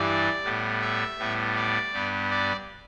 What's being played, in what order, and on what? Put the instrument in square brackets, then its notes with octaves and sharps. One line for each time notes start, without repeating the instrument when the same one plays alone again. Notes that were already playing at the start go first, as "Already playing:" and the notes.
Already playing: [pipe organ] G2 E3 G3 D5
A2 G3 B3
E5
A2 G3 B3
D5
G2 G3 B3
D5